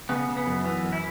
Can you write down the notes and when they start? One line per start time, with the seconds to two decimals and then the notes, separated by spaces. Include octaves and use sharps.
0.09 C#3 B3
0.28 C#3
0.37 B3
0.47 F#2
0.64 E3 B3
0.83 F#2
0.92 E4